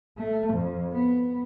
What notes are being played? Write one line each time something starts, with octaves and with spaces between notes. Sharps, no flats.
A3
F2
B3